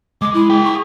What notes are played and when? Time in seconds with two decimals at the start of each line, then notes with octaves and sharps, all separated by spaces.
0.22 G#3 D6
0.34 E4
0.50 G#4 G5
0.64 C#6